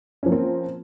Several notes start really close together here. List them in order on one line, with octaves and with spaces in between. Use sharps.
C#4 F3 A#3 C4